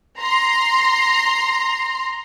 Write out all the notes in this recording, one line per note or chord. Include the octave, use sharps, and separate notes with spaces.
A#5 C6